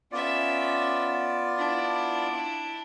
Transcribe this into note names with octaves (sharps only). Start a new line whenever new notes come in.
B3 C#4 F4 D5 E5
D4 E4